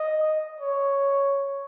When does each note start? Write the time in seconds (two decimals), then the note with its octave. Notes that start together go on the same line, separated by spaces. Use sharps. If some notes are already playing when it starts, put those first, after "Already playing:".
Already playing: D#5
0.61 C#5